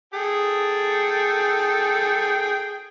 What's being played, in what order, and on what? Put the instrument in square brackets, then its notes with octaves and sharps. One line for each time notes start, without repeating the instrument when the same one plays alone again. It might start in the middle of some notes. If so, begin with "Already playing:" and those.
[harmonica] G#4 A4 G5